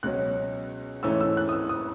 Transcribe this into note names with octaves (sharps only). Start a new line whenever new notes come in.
C#2 B2 F#3 C#4 F#6
G#2 E3 A3 C#4 E6
E6
F#6
D#6
E6
D#6